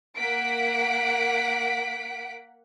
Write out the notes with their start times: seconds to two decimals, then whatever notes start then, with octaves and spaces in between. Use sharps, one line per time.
0.17 A#3 F#5 B6 D7